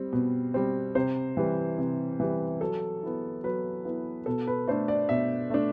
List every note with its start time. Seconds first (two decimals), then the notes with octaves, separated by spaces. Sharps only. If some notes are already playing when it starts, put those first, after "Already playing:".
Already playing: G3 C4
0.13 B2
0.54 G3 C4
0.95 C3 C5
1.37 E3 G3
1.78 C3
2.20 E3 G3
2.61 F#3 A4
3.03 B3 E4
3.44 F#3 B4
3.85 B3 E4
4.26 B2 A4
4.47 B4
4.68 A3 D4 C5
4.88 D5
5.09 B2 E5
5.50 A3 D4